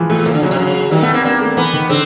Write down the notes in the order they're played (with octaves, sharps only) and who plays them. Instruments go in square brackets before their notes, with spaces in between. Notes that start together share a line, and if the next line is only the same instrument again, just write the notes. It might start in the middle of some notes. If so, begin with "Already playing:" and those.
Already playing: [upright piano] E3 F3 G#3
[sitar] A#2 [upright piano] A3
[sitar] C3 [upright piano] A#3
[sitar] D3
[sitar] C#3 [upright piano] F#3
[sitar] C3
[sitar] C#3 [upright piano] F#3
[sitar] D#3 [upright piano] G3
[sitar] A3 [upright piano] B3
[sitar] A#3 [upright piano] C4
[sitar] A#3 [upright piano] D4
[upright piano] A3
[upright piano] E3 [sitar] B3
[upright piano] D#3
[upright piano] D3 [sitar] C4